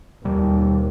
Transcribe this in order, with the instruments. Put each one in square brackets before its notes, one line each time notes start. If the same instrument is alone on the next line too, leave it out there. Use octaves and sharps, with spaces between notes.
[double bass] D#2 [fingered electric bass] B2 G3